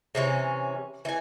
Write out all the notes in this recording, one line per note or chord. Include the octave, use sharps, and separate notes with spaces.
C3 E3 C#4
E3 G#5